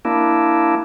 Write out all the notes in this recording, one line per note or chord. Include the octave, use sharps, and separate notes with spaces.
A#3 D4 E4